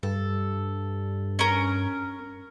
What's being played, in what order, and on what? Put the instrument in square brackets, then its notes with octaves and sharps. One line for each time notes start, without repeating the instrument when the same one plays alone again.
[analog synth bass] G2 [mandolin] A4
[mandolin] C#4 A#4